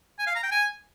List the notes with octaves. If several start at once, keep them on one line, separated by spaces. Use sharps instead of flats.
G#5
F5
A#5
G5
G#5